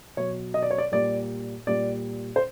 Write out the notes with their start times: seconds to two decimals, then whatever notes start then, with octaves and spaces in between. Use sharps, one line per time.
0.17 B2 F#3 C#5
0.54 D#5
0.63 D5
0.71 C#5
0.78 D5
0.92 A#2 G3 D5
1.67 A#2 G3 D5
2.36 C5